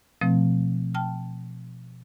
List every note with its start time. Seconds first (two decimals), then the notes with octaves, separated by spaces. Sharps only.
0.21 B2 F3 A3 C4
0.95 G5 A5 F6